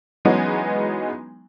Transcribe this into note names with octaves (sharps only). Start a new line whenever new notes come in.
E3 F#3 G#3 B3 C#4 D#4